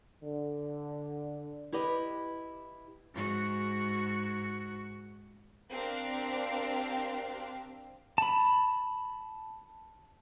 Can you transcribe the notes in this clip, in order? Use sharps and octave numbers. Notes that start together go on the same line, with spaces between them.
D3
E4 G4 B4 D#5
G#2 F#4
C4 D4 G4 A#4 C5 F5
A5 B5